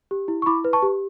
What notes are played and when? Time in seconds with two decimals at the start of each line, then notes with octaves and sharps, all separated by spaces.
0.11 G4
0.28 E4
0.42 C#6
0.46 E4 B5 D6
0.65 B4
0.73 A5 C#6
0.82 G4